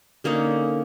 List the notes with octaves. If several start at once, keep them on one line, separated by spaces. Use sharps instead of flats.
D3 A#3 C#4 D#4